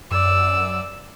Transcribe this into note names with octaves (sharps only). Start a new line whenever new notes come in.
F#2 D5 E6